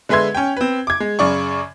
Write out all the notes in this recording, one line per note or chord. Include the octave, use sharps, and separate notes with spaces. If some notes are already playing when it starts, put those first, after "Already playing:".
D3 G#3 B4 E5 C6 G#6
C#4 G5
C4 B4
D6 G#6
G#3
F#2 C#3 D5 C#6